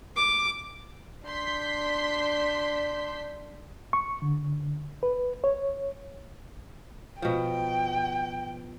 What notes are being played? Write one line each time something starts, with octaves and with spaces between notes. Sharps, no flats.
D6
D4 C6 G6 B6
C#6
D3
B4
C#5
B2 F3 G5